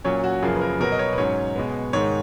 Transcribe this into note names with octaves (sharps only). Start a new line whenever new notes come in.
A#2 F#3 C#4 C#5
F#4
F#2 C#3 F3 A#3 G#4
B4
A#4
B2 F#3 B3 A#4
D#5
C#5
B4
G#2 F#3 C#4 C#5
B2 G#3 B3
G#2 D#3 G#3 C#5